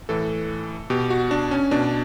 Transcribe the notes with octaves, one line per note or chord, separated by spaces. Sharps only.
A2 E3 A4
B2 G4
F#4
D4
C#4
B2 D4